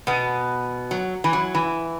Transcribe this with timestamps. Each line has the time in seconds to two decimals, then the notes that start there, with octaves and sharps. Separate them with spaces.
0.07 B2 B3
0.91 F#3
1.24 E3
1.33 F#3
1.55 E3